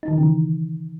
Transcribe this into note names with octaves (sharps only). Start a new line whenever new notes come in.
D#4
D#3
E3
C#3
E3